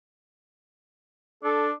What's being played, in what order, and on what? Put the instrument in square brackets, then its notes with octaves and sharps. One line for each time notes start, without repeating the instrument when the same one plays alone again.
[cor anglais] D4 [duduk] A4